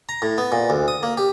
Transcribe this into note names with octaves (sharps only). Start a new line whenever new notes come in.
A#5
A2
B3
A#2
D2
D#6
A#3
G4